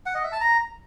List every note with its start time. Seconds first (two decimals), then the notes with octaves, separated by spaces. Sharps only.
0.06 F#5
0.15 D#5
0.23 E5
0.32 A5
0.41 A#5